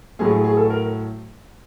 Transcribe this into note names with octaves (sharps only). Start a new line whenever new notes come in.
A2 F#3 A3 G#4
G#4
G#4
A4
A#4